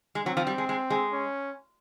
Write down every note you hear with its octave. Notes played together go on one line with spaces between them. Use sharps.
G#3
F#3 C4
F3
G3
G#3
G#3
G#3
C#4